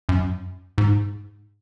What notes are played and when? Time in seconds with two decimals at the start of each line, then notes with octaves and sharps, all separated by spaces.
0.09 F#2
0.78 G#2